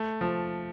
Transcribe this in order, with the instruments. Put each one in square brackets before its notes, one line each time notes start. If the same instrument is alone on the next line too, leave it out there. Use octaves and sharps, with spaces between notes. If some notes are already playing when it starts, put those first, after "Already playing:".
Already playing: [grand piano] A3
F3